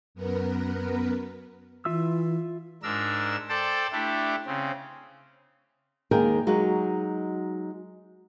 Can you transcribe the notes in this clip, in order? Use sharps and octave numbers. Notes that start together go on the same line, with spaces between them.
F#2 B3 A#4 B4
E3 F4 E5 E6
G#2 D4 A#4 E6
A4 C5 D5 G5 A5
A3 D4 E4 G4
C#3 C4
D#2 D#3 G#3 G#4 A#4 G5
F#3 G#3 D#4 F#4